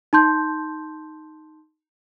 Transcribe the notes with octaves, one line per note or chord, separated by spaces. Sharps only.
D#4 A5 C6 G6